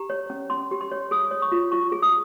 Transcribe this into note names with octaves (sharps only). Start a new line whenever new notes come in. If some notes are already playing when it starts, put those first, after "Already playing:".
Already playing: G4 A#5
C#5
C#4
C#4 C6
G4
C6
C#5
G#4 D#6
C#5
C#6
F4
F4 C#6
G#4
D#6